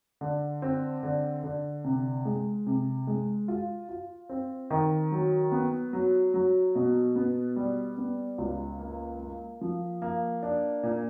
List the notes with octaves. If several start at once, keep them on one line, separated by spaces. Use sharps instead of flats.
D3
C4
D3
D3
C3
G#3
C3
G#3
F4
F4
C4
D#3
F#3
B3
F#3
F#3
B2
B3
G3
B3
C#2
A#3
A#3
F3
A#3
D4
A#2